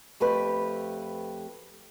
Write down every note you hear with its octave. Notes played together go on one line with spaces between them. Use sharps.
F2 A3 G4 B4